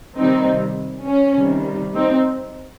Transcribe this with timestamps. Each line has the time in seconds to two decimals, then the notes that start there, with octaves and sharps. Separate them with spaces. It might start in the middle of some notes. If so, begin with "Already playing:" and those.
0.18 C3 D#3 G3 C4 D#4
1.06 C#4
1.37 C3 D#3 G3
1.95 C4 D#4